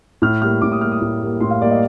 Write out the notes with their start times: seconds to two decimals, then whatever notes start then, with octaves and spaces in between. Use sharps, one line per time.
0.22 A2 F6
0.42 G3 A#3 F6
0.62 A2 D6
0.72 D#6
0.81 G3 A#3 F6
0.92 D#6
1.01 A2
1.22 G3 A#3
1.41 A2 C6
1.51 F5
1.61 G3 A#3 D5
1.71 D#5